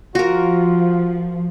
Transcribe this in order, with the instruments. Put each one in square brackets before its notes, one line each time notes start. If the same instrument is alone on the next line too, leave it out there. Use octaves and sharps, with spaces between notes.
[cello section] F3 [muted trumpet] F4 [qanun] F#4 A#4